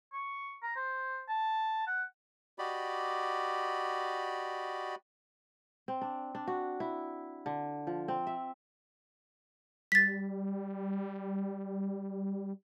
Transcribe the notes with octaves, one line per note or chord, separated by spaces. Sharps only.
C#6
A#5
C5
A5
F#5
F#4 G4 D5 D#5 B5
C4
D4
D4
F#4
E4
D3
F3
C4
E5
G3 A6 B6